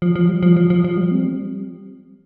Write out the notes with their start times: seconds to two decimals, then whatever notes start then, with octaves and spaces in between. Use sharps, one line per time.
0.02 F3
0.16 F3
0.29 G3
0.43 F3
0.57 F3
0.70 F3
0.84 F3
0.97 G3
1.11 C4
1.25 G3